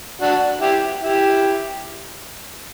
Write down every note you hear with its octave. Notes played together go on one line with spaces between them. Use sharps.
D4 F#4
E4 G4
E4 G4